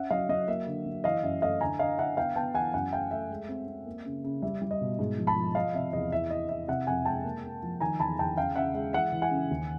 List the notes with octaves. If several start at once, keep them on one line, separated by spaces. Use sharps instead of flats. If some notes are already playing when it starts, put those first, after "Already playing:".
Already playing: C#4 E5 F#5
F#3 D#5 F5
F#3 D#5
A#3 E5
D3
F#3
E3 D#5 F5
F#2 E5
A3 D#5 F5
D3 G#5 A#5
D3 D#5 F5
D3 E5 F#5
B3 F5 G5
B3 G5 A5
E3 F#5 G#5
F#2 F#5 G#5
A3 F5 G5
A3 E5
G#3
C4
C4
A#3
C#3
C#3
G3 E5
G3
D#5
B2
G#2
F3
A5 B5
F3
F3 D#5 F5
C3 E5
E2 D#5
E4 E5
E4 D#5
E4 E5
C3 E5 F#5
F2 F#5 G#5
G#3 G5 A5
A#3
A#3
F3
D#3 G#5 A#5
E2 A5 B5
E2 G5 A5
C#3 F5 G5
C#3 E5 F#5
G#3 E5
E3 E5 F#5
E3
F#5 G#5
C#3
D#2